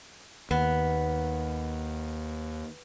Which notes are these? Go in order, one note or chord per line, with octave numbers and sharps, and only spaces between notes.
D#2 B3